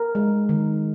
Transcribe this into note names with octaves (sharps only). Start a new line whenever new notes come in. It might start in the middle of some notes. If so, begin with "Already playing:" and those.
Already playing: A#4
G#3
D#3